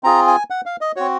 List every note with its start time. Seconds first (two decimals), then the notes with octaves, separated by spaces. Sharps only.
0.03 C4 F4 G#4 A#5
0.27 G#5
0.50 F#5
0.66 F5
0.81 D#5
0.96 C4 F#4 C#5